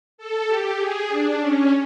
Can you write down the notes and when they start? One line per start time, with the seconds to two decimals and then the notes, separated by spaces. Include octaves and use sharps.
0.18 A4
0.47 G4
0.78 G#4
1.09 D4
1.39 C#4